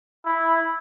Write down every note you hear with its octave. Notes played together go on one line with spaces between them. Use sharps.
E4